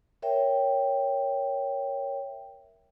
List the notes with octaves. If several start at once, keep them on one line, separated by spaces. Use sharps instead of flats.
A#4 C#5 E5 G5